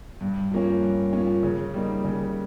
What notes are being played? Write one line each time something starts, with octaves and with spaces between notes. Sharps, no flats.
G2
F3 A#3 C#4
G2
F3 A#3 C#4
C#3
G3 A#3 D#4
C#3